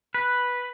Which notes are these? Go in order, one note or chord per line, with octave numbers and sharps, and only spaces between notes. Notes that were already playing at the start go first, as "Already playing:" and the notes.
B4